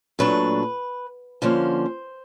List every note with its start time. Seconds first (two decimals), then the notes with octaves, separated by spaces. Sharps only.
0.19 A#2 F#3 A3 D4 B4
1.42 D3 F3 A#3 C#4 C5